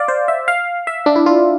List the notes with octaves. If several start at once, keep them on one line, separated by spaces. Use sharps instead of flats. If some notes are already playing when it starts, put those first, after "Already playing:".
Already playing: D5 F5
C5
E5
F5
E5
D4
E4
F4